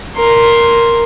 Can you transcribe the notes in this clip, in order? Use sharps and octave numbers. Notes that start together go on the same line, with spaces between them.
A#4 C6